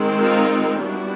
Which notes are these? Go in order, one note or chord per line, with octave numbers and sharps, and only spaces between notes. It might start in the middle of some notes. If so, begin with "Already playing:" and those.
Already playing: D#3 G#3 C4
D#4 F4
G3 B3 D4 E4 F#4